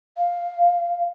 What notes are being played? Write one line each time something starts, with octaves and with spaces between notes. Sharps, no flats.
F5